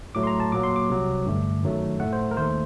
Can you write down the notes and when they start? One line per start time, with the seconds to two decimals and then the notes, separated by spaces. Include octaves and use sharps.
0.15 A2 F#3 A3 D6
0.23 C6
0.27 A#5
0.40 A5
0.52 A#2 F#3 A#3 D6
0.63 C6
0.76 D6
0.89 C2 C3 F#3
1.26 G2 D3 A3
1.63 F#2 D#3 F#3 A3
2.00 A2 A3 F#5
2.13 C5
2.31 A#4
2.37 D#2 D#3 A3 C5